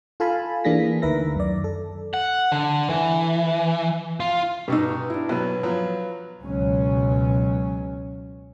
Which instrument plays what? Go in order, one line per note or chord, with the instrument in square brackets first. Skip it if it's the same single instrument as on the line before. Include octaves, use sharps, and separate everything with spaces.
[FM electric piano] F4 A4 F5 G#5 A5 B5
E3 A#3 D4 G#4 A#6 B6
D2 D#3 A#4 B4 E5 A#6
F#2 D5
A4
[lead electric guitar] F#5
D3
E3
F4
[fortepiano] G2 D#4 [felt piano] B2 C#6 E6
[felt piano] D4 E4
[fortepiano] B2 F#3 [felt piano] B4
[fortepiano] F3 F#3
[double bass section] C#2 B2 F#3 C#4